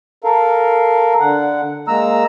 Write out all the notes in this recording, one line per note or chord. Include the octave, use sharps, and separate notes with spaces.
A4 A#4 F5
D3 F#5
G#3 A#3 A#5 E6